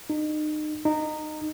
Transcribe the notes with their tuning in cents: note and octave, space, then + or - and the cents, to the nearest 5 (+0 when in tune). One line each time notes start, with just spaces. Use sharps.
D#4 -35
D#4 -20